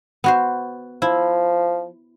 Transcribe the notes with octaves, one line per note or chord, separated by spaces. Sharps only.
B3 F#4 C5
F3 E4